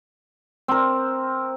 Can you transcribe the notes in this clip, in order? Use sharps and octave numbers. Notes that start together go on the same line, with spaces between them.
C4 A#4